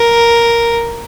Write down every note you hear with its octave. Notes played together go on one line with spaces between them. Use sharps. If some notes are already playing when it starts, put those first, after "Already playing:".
Already playing: A#4